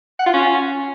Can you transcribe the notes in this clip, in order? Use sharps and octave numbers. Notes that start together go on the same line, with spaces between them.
F#5
F4
C#4